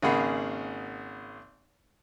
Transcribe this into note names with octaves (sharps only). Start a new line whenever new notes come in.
G#1 C#3 A#3 G#4 F#5 B5